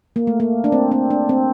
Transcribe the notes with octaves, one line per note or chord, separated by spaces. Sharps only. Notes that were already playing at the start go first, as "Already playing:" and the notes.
A#3
A3
A#3
D4
C4
C4
D4
C4